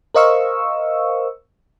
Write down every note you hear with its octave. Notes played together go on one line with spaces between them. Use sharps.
A#4 C5 D#5 F5 C#6 E6